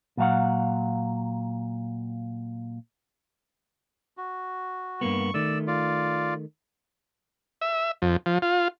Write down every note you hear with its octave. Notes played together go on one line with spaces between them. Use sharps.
A#2 F#3 F5 F#5
F#4
G2 A#3 B3 C#6
D#3 A3 D5 E6
F4 D5
E5
F2
F3
F4